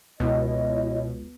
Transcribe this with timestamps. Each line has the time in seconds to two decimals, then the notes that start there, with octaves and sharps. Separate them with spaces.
0.20 C#2 B2 B3 E4 C#5 D#5